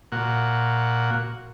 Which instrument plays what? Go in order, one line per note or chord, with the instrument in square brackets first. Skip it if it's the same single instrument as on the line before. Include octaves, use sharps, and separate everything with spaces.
[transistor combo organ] A#2 F#4